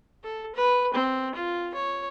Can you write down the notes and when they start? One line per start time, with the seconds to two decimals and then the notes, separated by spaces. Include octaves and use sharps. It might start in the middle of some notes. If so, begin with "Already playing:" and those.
0.24 A4
0.55 B4
0.94 C4
1.35 F4
1.75 C#5